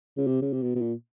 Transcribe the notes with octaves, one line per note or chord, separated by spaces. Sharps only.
C#3
C3
C#3
C3
B2
B2
A#2